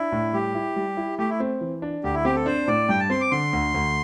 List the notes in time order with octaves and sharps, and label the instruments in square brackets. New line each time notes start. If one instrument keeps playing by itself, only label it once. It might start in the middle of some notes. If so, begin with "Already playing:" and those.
Already playing: [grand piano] D4 [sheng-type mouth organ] E4
[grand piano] A2
[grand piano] G3 [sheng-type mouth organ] G4
[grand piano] E4
G3
E4
[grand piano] A3 [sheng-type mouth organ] G4
[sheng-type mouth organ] E4
[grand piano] C4
E3
D4
[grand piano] D2 [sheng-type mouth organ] G4
[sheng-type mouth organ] E4
[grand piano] C4 [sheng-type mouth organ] G4
[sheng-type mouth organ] A4
[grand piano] D4 [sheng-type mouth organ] C5
[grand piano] A2 [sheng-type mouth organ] D5
[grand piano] G2 [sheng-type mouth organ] G5
[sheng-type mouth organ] A5
[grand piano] C4 [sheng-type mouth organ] C6
[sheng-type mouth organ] D6
[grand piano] D3 [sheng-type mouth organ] C6
[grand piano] D2
D2